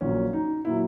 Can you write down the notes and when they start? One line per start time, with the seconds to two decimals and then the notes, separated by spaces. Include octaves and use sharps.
0.01 A#1 A#2 F#3 C#4
0.33 D#4
0.65 A#2 F#3 E4